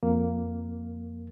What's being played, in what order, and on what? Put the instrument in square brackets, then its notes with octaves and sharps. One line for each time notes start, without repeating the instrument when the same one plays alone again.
[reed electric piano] F2 A#3